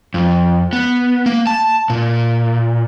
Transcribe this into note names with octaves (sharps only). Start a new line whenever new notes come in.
F2
B3
A#3
A5
A#2